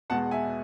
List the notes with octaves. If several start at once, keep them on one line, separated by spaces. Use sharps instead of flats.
E2 B2 G#3 F#5 A5
E5 G#5